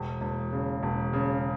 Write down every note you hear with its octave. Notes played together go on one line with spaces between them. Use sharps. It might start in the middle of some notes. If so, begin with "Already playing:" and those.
Already playing: E1
E1
C#3
E1
C#3